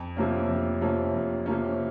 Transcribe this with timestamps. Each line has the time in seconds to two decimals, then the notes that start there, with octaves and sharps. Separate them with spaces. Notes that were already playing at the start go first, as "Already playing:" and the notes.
Already playing: F2
0.17 C3 F3 A#3 C#4
0.49 F2
0.81 C3 F3 A#3 C#4
1.14 F2
1.46 C3 F3 A#3 C#4